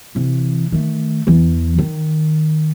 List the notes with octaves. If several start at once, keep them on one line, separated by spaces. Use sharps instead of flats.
C3 E3
D#3 A3
E2 E3
D#3